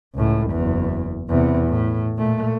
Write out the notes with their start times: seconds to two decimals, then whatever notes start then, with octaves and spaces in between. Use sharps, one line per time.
0.15 C#2 A2
0.51 F#1 E2
1.29 E2 C3
1.68 A2
2.18 A#2 A3